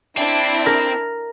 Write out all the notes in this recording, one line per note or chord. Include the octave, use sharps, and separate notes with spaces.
C4 D4 E4
A#4